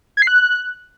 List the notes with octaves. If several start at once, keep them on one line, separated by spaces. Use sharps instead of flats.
G#6
C7
F#6